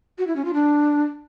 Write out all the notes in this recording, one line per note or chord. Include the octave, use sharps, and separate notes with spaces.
F#4
E4
C#4
F4
D4